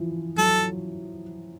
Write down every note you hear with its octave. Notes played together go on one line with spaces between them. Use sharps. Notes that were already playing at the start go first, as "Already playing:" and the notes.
Already playing: E3 F3
F#3 A4